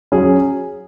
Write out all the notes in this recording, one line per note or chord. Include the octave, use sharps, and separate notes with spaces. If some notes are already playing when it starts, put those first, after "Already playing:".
F#3 C#4 G#4